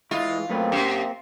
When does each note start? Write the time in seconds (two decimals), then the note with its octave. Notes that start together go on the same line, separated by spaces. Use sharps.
0.11 G#3 E4 F4
0.23 E3
0.49 F#2 A3 A#3 C4 B4
0.72 F#2 G4